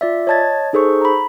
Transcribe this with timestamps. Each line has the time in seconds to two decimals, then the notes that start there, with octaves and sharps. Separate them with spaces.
0.01 F4 D5 E5
0.27 C#5 D#5 A5 G#6 A6
0.73 D#4 G#4 A4 C5 C#6
1.01 A#5 B5